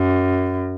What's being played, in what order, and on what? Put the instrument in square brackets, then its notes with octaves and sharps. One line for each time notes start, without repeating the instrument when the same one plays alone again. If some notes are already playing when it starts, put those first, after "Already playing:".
Already playing: [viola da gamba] F#2